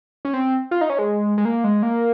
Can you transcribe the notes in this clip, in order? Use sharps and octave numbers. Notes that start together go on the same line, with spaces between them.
C#4
C4
F4
D#4
C#4
G#3
G#3
A#3
G#3
A#3